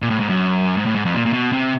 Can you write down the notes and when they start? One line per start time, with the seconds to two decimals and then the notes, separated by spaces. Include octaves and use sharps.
0.02 A#2
0.10 A2
0.20 G#2
0.29 F#2
0.77 G#2
0.86 A2
0.95 G#2
1.05 F2
1.14 A#2
1.26 A#2
1.33 B2
1.52 C3